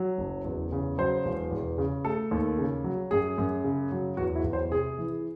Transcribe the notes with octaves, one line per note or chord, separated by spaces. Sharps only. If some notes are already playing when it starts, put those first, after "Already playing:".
Already playing: F#3
F#1
E2
C#3
F#3 C5
E1
E2
C#3
A3 A4
D#2
C#3
F#3
F#2 G#4
F#2
C#3
F#3
E2 F#4
E4
E2
C5
C3 G#4
E3